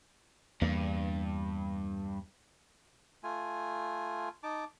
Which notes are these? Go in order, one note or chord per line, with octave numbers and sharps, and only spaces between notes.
E2 G2 A#3
A3 F4 G#5
D#4 A5 D6